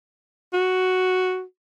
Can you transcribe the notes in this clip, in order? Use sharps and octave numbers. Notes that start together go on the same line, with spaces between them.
F#4